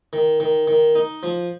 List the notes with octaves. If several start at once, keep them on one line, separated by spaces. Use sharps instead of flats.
D#3
D#3
D#3
D#4
F3